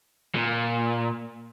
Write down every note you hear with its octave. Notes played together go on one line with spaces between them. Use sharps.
A#2